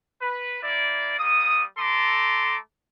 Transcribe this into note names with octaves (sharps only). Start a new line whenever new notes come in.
B4
A#3 E4 D5
G3 A#3 D#6
A3 A4 A#5 C6 D6